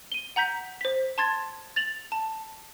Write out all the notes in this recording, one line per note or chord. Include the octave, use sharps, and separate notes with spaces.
D#7 G7
F#5 A#5 G6 B6
C5 B6
A5 C6 G#6 A6
A6 F7 F#7
A5